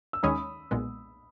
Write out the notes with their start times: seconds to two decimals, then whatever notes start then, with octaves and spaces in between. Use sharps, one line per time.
0.13 E6
0.23 D#2 D#3 G#3 C#4 B5 D#6
0.71 B1 A#2 G#3 B3